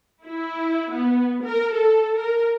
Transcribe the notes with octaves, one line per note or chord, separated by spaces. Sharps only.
E4
B3
A#4
A4
A#4